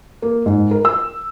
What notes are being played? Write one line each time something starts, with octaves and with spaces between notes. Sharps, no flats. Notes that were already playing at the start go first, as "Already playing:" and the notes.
A#3
G#2
A#4
E6